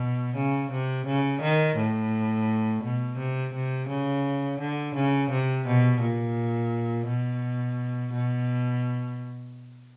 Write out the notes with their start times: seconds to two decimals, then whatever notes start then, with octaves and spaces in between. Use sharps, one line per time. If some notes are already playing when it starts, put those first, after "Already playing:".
Already playing: B2
0.35 C#3
0.71 C3
1.06 C#3
1.42 D#3
1.77 A2
2.83 B2
3.18 C3
3.54 C3
3.88 C#3
4.59 D3
4.95 C#3
5.31 C3
5.66 B2
6.01 A#2
7.07 B2
8.13 B2